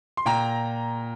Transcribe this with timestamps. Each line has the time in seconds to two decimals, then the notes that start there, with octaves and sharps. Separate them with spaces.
0.17 C6
0.25 A#2 G5 A#5